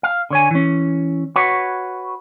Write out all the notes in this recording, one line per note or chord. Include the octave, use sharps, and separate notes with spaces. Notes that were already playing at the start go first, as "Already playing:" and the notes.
F5
D3 C#5 G#5
E3 C#4
F#4 B4 C#5